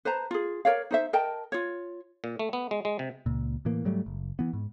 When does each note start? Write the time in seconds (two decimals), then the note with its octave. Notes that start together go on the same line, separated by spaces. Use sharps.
0.05 B4 C5 A5 A#5
0.31 F4 G#4
0.65 A#4 C#5 D5 F5
0.91 D#4 C5 E5
1.13 A#4 D#5 G5 A5
1.52 F4 C#5
2.24 A#2
2.39 A3
2.53 B3
2.71 G#3
2.85 G#3
2.99 C3
3.26 C#2 A#2
3.65 A2 E3 A#3
3.85 G#2 F#3 G3 A3
4.06 F#1
4.39 E3 B3
4.53 G#2